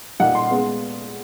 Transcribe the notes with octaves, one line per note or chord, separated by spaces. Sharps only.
A#2 G3 A#3 D#4 F#5
C6
G#3 B3